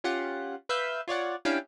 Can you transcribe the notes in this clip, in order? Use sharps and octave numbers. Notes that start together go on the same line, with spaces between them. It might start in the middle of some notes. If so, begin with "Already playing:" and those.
C#4 F4 G4 F#5
B4 E5 F5 E6 G6
F4 C#5 D5 F#5
C#4 D4 E4 G4 F5 G5